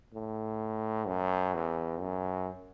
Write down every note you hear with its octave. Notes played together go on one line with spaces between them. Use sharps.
A2
F#2
E2
F#2